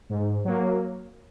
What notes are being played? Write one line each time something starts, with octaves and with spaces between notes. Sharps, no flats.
G#2
F#3 A#3